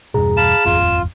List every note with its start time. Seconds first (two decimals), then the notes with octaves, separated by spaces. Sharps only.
0.14 E2 G2 B2 G#4 A#5
0.37 F5 A5 B5 E7
0.65 D#1 G#1 F2 F4